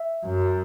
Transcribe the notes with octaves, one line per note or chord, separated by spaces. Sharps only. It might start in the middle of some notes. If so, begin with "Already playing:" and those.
Already playing: E5
F#2